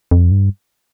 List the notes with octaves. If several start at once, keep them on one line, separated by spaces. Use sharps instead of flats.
F2
G2